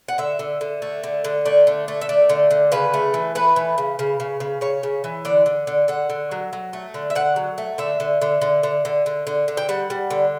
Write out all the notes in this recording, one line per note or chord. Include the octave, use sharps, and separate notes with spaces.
F#5
D3 E5
D3
D3
A3
D3
D3
A3 D5
D3
A3
E5
A3 D5
D3
D3
C#3 B4
A3
E3
A3 B4
E3
C#3
C#3
C#3
C#3
C#3 C#5
C#3
E3
D3 D5
D3
D3
D3 F#5
D3
F#3
F#3
A3
D3
E5
D3 F#5
F#3
A3
D3 E5
D3
D3
D3
D3
D3
D3
D3
D3
G5
G3 F#5
G3
D3